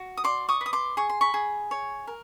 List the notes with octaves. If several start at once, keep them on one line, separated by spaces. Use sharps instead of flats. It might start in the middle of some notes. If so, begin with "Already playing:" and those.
Already playing: F#4
D#6
D5 C6 D6
C#6 D#6
B4
D#6
C6 D6
G#4 C#6
C6
B5 C#6
G#4
C#5
A#4